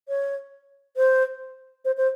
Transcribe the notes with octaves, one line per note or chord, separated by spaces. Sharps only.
C#5
C5
C5
C5